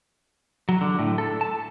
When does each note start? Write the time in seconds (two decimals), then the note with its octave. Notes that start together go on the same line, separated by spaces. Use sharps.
0.69 F#3
0.81 D3
0.99 A2
1.18 A4
1.41 A5